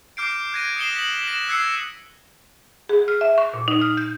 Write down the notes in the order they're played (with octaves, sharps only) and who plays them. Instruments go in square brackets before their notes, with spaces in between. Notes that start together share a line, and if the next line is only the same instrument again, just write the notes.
[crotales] D6 F6 G6 C7 D7
F#6 G#6 A#6 D#7
D#6 C7 C#7 E7 G7
B6 F#7
F#6 A#6 B6 E7
E6 F#6 G#6 C7 C#7
[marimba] G#4
F6
E5
C#6
A#2
D#4
F6
G6